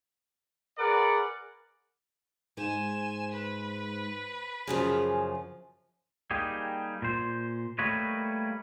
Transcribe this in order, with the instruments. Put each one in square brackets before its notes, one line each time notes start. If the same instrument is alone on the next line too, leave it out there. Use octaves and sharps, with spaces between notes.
[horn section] G#4 A#4 B4 D5 F#5
[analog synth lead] G#2 [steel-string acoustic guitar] C5 [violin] G#5 E7
[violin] B4
[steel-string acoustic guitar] F#2 C#3 F3 [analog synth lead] G#4
[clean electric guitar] G3 A#3 D#4 G4 G#4
A#2 C5
G3 A3 A#3 B4 C#5 D#5